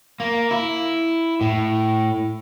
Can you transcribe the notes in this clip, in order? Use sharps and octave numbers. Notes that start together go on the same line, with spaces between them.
A#3
E4
A2